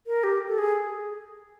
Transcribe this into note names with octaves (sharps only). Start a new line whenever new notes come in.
A#4
G4
A4
G#4